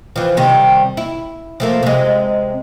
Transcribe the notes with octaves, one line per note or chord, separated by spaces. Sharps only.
E3 F3
C3 D#3 G3
E4
F3 A3 A#3
C3 G#3